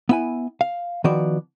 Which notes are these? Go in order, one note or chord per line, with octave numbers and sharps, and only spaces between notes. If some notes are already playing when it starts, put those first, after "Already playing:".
B3 E4 G#5
F5
D#3 F3 B3 F#4 D5